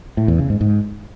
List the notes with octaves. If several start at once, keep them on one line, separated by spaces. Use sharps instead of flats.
A2
E2
C#3
G#2
G#2